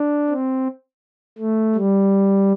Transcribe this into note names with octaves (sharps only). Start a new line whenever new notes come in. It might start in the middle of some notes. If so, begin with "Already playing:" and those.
Already playing: D4
C4
A3
G3